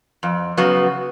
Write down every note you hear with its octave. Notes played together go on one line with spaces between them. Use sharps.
F2
C#3 F#3 B3